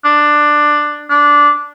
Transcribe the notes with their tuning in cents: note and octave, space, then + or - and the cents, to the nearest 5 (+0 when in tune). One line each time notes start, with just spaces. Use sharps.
D4 +10
D4 -10